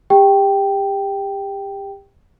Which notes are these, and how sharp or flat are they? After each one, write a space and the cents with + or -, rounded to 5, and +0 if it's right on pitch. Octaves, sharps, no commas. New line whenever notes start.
G4 +30 G5 +0